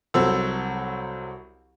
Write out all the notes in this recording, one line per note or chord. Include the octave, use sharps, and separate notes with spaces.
C2 F#3 C4 A4 E6